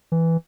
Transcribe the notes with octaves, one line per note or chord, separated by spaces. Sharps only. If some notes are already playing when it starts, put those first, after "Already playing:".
E3